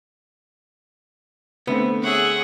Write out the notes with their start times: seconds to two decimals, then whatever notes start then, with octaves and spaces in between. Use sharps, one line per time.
1.67 D3 A3 B3 C4
2.03 G#4 C#5 E5 F#5